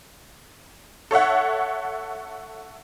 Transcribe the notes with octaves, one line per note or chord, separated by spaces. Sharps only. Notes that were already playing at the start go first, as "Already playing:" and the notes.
A4 C#5 E5 F#5